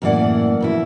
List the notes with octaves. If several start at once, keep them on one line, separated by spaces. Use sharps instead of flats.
F#2 A2 E3 A#3 D5 F#5
F2 B2 E4